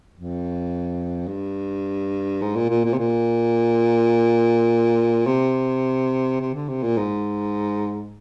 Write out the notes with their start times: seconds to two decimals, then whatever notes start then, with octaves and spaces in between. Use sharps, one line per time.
0.14 F2
1.28 G2
2.42 G#2
2.56 A#2
2.70 A#2
2.84 A#2
2.93 C3
2.98 A#2
5.27 C3
6.40 C3
6.54 D3
6.68 C3
6.83 A#2
6.97 G#2